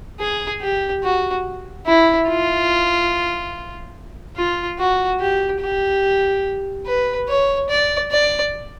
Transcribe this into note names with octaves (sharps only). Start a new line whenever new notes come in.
G#4
G4
F#4
E4
F4
F4
F#4
G4
G4
B4
C#5
D5
D5